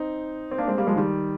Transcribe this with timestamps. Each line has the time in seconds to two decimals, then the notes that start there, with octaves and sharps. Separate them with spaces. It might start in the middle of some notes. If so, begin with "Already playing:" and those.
Already playing: C4 D#4
0.51 C4
0.58 A#3 D4
0.68 G#3 C4
0.77 G3 A#3
0.87 F3 G#3
0.96 D#3 G3